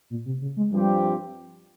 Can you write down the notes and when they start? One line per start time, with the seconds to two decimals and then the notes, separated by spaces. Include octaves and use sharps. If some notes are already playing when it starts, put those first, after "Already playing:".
0.10 A#2
0.26 C3
0.41 C#3
0.57 G#3
0.72 G2 F3 G3 C4 G4